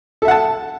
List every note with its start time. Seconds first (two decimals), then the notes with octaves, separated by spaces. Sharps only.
0.22 A4
0.25 E5
0.28 F#5
0.31 A5